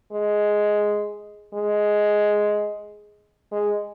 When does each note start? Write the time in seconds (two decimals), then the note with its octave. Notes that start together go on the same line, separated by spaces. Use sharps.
0.13 G#3
1.54 G#3
3.52 G#3